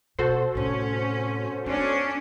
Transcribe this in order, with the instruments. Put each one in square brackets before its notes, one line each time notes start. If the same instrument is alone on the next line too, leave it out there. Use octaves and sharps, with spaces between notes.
[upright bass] B2 [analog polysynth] F#4 A4 C5
[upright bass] A2 C3 [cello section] C#4
[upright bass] B3 [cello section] C#4 D4